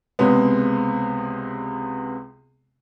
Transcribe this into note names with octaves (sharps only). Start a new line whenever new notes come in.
C#2 C3 G#3 B3